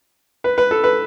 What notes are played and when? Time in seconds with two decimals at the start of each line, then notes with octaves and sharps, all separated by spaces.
0.44 B4
0.58 B4
0.71 A4
0.84 B4